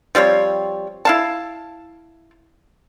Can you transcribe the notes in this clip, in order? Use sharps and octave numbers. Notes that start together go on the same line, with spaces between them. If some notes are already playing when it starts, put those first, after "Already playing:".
F3 G3 C4 C#5
E4 F5 A5